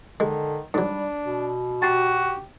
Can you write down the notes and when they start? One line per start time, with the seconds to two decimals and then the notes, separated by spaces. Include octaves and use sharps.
0.20 D3 D#3 G#3
0.74 G#2 F#3 G3 D4
1.25 B2
1.82 F#4 G4 A5 C6